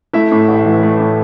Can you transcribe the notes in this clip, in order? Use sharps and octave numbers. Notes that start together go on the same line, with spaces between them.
A3 E4 E5
A2
A1
E3
A3
A2